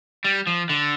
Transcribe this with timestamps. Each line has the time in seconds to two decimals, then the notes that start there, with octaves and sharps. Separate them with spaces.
0.24 G3
0.47 F3
0.69 D3